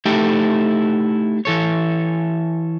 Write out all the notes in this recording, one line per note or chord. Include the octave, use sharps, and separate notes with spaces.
A3 D#4 E4 G4 A4 G5
E3 A4 C#5